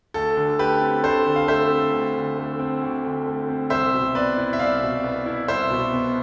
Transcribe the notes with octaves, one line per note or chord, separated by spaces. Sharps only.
D2 A4
D3
A3 G4 B4
C4
D2 A4 C5
D3
F5
A3 C5 E5
C4
D2
D3
A3
C4
D2
D3
A3
C4
C2 C5 E5
B2
B3 B4 D5
E4
E5
C2 D5 F5
B2
B3
E4
C2 C5 E5
B2
B3